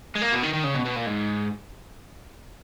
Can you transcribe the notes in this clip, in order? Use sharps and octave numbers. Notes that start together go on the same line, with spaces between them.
G#3
A#3
B2
D#3
D#3
C#3
B2
B2
A#2
G#2